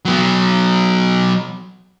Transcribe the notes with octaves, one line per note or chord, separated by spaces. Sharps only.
F#3 B3